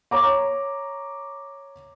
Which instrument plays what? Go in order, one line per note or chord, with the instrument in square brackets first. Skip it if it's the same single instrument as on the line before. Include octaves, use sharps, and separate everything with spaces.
[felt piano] C#5 A#5 D6